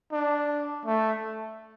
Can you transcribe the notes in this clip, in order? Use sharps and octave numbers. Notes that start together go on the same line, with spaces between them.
D4
A3